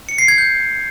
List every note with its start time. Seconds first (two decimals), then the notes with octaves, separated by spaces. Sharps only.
0.09 C#7
0.18 C7
0.28 G#6
0.38 G6